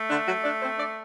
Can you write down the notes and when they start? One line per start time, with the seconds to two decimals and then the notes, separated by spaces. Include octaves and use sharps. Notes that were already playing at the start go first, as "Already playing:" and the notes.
Already playing: A3
0.09 D3 D4
0.26 F#3 F#4
0.43 D4 D5
0.62 C4 C5
0.78 D4 D5